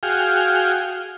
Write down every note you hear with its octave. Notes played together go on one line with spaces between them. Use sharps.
F#4 G#4 F5 G5